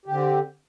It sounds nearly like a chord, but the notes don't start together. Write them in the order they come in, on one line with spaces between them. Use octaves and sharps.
G4 D3 C4